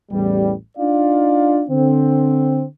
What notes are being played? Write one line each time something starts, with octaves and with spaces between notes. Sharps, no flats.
A1 E2 G3
D4 D#4 F4 D5 F5
D3 C4